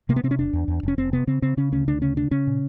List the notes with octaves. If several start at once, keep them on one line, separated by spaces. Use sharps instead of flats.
C3 A#3
B3
C3 C4
C#4
F1 D4
E2
E2
F1 C#4
F1 C4
C3 B3
C#3 C4
C#3 C4
C#3 C#4
D2 C#4
D2 D4
C#3 C#4
C#3 D4
C#3 C#4
A#2